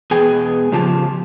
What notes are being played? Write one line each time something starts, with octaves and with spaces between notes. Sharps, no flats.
E2 B2 G#4 G5 G#5
A2 C#3 F3 F4 G4 A5